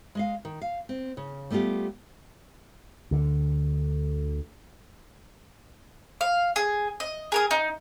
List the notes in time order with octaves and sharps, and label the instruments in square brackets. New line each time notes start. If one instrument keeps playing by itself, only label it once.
[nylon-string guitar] G#3 D#5 F5
D#3
F5
C4
C#3
G3 A3 B3 F4 G4
[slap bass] D2 D3
[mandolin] F5
G#4
D#5
G#4 A#4 D#6
D#4